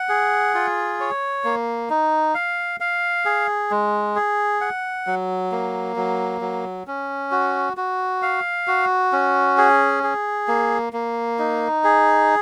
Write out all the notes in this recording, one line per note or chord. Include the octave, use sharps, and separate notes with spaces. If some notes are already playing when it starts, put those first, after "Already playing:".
Already playing: F#5
G#4
F4
C#5
A#3
D#4
F5
F5
G#4
G#3
G#4
F#5
F#3
A#3
F#3
F#3
C#4
F#4
F#4
F5
F#4
C#4
G#4
G#4
A#3
A#3
D#4
G#4